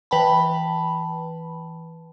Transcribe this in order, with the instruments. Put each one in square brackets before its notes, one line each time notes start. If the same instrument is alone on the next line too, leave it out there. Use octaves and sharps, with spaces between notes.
[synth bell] E3 B4 G5 A5 B5